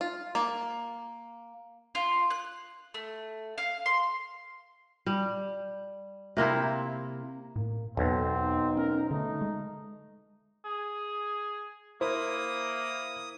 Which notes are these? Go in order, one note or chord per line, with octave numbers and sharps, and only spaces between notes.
F4
A#3
F4
F#6
A3
F5
C6
G3
C3 A#3 C4 E4
A2 A#3
B1 E2 C4 A4
D#4
C#4 A#4
D3 A3 D#4
G#3
G#4
A#3 E4 A#4 C5 D#6